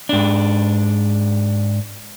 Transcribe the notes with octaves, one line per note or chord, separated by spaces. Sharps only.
G#2 D4